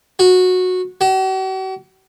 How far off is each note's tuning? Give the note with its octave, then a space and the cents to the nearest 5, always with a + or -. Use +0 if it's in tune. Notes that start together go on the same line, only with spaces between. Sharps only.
F#4 -15
F#4 +45